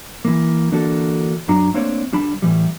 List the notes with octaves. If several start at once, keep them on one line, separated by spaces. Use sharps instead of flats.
E3 A#3
D3 E3 A#3 D4 F#4 A4
F#2 F#3 D4 A#5
A3 A#3 C4 D4 C5 C#5
D2 G3 D4 A5 B5
A2 E3 G3